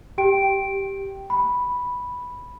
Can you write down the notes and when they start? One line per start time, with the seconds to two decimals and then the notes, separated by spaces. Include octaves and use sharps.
0.18 G4 G5 D7
1.30 B5